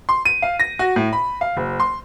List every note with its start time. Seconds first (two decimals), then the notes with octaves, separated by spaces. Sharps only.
0.09 C6
0.25 D#7
0.42 F5
0.60 A#6
0.79 F#4
0.96 A2
1.13 B5
1.41 F5
1.57 F#1
1.80 C6